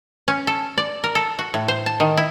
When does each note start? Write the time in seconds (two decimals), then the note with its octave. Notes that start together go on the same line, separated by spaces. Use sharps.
0.28 C#4
0.47 A4
0.78 D5
1.04 A#4
1.15 A4
1.39 F#4
1.54 A2
1.68 C5
1.86 A5
2.00 D#3
2.17 E4